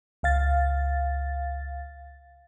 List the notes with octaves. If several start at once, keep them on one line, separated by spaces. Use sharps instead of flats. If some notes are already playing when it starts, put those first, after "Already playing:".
C#2 F5 A6